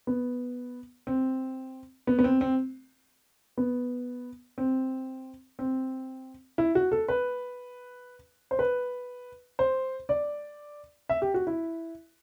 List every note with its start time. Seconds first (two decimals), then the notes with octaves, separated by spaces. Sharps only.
0.07 B3
1.07 C4
2.07 B3
2.19 B3
2.24 C4
2.41 C4
3.58 B3
4.58 C4
5.59 C4
6.58 E4
6.75 F#4
6.92 A4
7.08 B4
8.51 C5
8.59 B4
9.59 C5
10.09 D5
11.09 E5
11.22 G4
11.34 F#4
11.47 E4